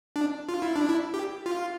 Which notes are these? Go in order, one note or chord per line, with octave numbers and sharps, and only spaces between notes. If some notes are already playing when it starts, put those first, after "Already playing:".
D4
F4
E4
D4
E4
G4
F4